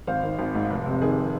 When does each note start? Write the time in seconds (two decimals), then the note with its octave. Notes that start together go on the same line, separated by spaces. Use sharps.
0.07 G#1 C5 F5
0.23 D#3
0.39 G#1
0.55 G#2
0.70 F1
0.86 C3
1.01 D#3 G#4